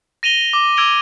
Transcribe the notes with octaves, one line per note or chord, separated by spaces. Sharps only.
A#6 D#7 F7 G7
F7
D6
D6 E6 G#6 D7 F7 G7